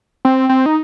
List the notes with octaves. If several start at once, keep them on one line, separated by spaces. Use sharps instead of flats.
C4
C4
D#4